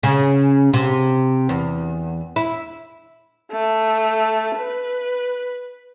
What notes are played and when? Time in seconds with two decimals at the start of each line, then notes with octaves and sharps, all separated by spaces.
0.03 C#3
0.73 C3
1.49 E2
2.36 E4
3.52 A3
4.57 B4